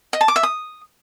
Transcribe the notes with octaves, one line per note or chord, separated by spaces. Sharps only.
D#5
A5
D6
E5
D#6